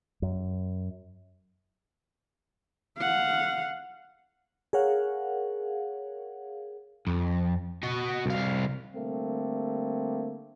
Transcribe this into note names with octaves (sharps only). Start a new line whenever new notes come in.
F#2
F5 F#5
G#4 A#4 C#5 F5 F#5
F2
F#4 D#5
C2 F5
D3 G3 A3 A#3 C4